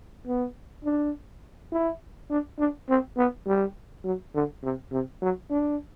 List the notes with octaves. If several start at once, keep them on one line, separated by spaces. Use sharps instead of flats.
B3
D4
E4
D4
D4
C4
B3
G3
F#3
D3
C3
C3
F#3
D4